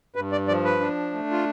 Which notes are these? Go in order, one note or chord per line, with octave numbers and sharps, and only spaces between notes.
G2 B4
D5
F3 D5
B4
D4
A3
F4